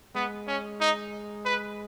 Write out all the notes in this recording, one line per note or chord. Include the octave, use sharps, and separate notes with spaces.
G#3 B3
C#4
D#4
B4